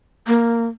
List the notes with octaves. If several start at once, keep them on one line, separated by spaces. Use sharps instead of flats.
A#3